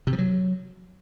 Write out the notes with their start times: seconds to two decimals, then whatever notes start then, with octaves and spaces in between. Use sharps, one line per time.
0.07 C3
0.13 F3
0.18 F#3